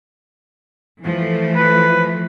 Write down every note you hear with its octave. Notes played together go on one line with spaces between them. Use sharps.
E3 F3 A3
B4